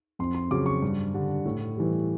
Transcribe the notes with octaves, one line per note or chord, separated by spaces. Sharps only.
F2 C6
C6
C#3 F#3 D6
C#6
G2
D3 G3
A2
E3 G3